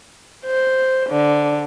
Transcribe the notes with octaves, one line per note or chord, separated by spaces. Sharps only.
C5
D3